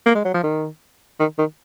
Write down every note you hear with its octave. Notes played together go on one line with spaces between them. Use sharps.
A#3
G#3
F#3
F3
D#3
D#3
D#3